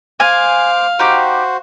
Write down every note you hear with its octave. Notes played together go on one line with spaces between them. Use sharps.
C5 F5 G#5 D6
D#4 F#4 G4 C5